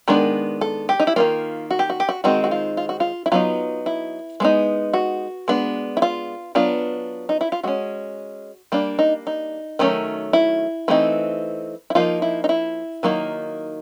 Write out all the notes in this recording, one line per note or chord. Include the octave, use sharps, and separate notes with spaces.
D#3 G#3 B3 D4 A#4
A4
G4
D#4
E4
D#3 G3 A#3 F4
F#4
G4
F#4
G4
F#4
D#3 G#3 C4 D#4 F#4
F#4
F4
F4
F#4
F4
E4
F#3 B3 D#4 F4
E4
G#3 B3 D#4
F#4
G#3 B3 D4
E4
F4
F#3 B3 D4 F4
D#4
E4
F4
G#3 C#4 F#4
G3 A#3 D4
D#4
D#4
D#3 F#3 A3 C#4
E4
E3 A3 C4 D#4
E4
F3 A#3 D#4 F4
E4
D#4
E4
D#3 F#3 A#3 D#4